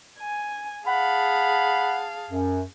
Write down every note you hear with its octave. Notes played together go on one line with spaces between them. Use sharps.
G#5
G#4 F5 F#5 A5 B5
F#2